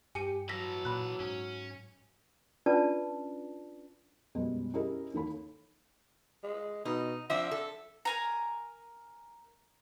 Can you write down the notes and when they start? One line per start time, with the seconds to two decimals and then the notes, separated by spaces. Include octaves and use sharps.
0.15 G2 G4 G#5 C#7 D#7
0.49 E3 F#3 A4 E6 A#6 B6
0.85 A#2 B5 F#6
1.20 G#2 C#4
2.66 C#4 D4 F4 B4 D5 A5
4.35 F#2 B2 G3 G#3
4.74 C#4 E4 G4 G#4 A#4 D#5
5.13 D#2 E3 A#3 A4 C#5 B5
6.43 G#3
6.85 B2 D#4
7.30 F3 C4 D4 E5
7.51 A4
8.05 A#4 G#5 A#5